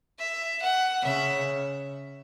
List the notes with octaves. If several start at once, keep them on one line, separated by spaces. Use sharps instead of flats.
E5
F#5
C#3 E5